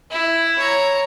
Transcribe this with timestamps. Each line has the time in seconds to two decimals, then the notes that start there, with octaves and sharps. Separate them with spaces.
0.10 E4
0.59 C#5 A#5